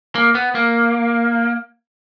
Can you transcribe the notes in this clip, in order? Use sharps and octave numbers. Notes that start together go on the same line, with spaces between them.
A#3
B3
A#3